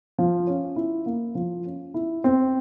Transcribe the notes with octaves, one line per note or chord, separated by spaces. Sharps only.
F3
C#4
E4
A#3
F3
C#4
E4
C4